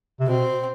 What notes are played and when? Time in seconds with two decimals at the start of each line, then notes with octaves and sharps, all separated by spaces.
0.20 C3
0.27 B2 C4